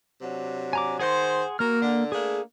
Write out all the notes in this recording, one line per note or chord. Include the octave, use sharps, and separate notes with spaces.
C3 F#3 D4
G#5 A#5 D6
D#3 G#4 C5 F#5 C6
A#3 F#4 A#4 F6
D3
A3 A#3 D4 G#4